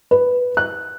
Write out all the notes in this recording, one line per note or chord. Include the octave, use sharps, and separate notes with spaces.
B4
F#6